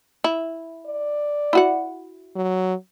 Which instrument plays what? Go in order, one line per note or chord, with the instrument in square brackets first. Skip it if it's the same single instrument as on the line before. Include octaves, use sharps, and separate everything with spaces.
[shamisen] E4
[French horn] D5
[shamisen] E4 F#4 F#5
[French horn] F#3